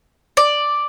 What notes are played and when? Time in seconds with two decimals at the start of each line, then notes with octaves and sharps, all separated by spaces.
0.37 D5